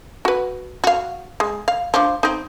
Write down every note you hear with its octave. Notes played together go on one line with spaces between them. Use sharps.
F#4 B4
F#4 F5
G#3
F5
F3 D4
C4 D#4